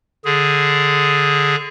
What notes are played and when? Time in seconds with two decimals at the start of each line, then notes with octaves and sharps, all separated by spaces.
0.25 D3 G#4